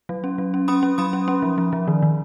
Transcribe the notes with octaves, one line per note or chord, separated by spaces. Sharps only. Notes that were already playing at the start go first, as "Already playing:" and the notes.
F#3
C#4
F#3
C#4
C#4 B5 D#6
C#4
F#3 B5 D#6
C#4
C#4
F3
F3
F3
D#3
D#3